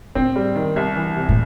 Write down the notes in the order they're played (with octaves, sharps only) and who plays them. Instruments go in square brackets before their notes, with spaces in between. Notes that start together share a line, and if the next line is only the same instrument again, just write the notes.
[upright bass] A2 [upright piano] C4
[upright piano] G3
D#3
C2
E3
C3
[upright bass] A2